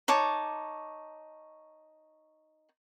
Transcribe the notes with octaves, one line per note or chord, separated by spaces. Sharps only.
D#4 C#5 A5 D6